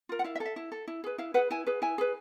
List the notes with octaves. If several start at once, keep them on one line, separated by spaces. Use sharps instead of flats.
F4 A#4
F#5
E4 F5
E5
A4
E5
E4
A4
E4
G#4 B4
E4 F5
G#4 B4 F#5
E4 G#5
G#4 B4
E4 G#5
G#4 B4